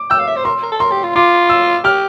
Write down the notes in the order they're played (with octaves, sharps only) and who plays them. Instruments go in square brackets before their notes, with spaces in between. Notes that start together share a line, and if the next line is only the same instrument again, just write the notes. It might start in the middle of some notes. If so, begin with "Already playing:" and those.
Already playing: [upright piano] D6
[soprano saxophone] G5 [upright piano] E6
[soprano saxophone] F5
E5
C5
[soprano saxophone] A#4 [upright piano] C6
[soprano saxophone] A#4
A4
[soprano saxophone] A#4 [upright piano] C6
[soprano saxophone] G4
F4
[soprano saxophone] F4 [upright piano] D6
[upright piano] E6
[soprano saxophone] G4 [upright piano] F6